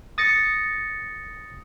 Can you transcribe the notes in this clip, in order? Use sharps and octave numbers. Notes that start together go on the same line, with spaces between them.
D#6 A6 A#6 C#7